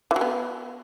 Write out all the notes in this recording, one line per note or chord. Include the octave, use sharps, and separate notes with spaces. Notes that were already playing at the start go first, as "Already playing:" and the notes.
E3
F#3
B3